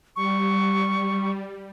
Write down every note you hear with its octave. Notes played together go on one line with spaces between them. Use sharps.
G3 C#6